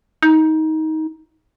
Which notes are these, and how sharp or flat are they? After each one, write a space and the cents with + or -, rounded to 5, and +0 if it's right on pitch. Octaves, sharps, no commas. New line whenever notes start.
D#4 +20